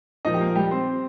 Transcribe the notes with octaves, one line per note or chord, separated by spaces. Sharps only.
A#2 F3 A#3 D#4 D#5
G4
A#3 A#4
G3 G4
C4 C5